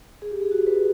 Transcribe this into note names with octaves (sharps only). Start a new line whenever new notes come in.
G#4
G4
G#4
F#4
B4